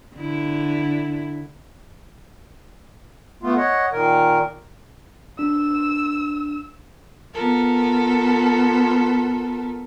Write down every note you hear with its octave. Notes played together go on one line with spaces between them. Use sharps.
D3 E4
A3 B3 F4
C#5 D#5 F#5
A#2 D#3 A#4
D4 E6
B3 F4 A4 A#4